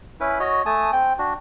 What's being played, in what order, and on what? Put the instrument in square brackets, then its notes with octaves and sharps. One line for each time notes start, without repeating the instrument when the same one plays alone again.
[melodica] C#4 E4 B4
F#4 C#5 D#5
A3 G#5 A5 D#6
C4 G5
D4 F#4